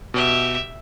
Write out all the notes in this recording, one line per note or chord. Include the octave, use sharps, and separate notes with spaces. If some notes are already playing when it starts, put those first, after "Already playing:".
B2 G4 E5